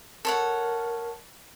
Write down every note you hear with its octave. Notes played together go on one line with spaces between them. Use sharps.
A4 A#4 C#5 F#5